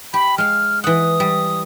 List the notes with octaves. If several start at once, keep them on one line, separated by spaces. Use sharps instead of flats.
G4 B5
G#3 F5 F6
E3 F#5 D#6
G3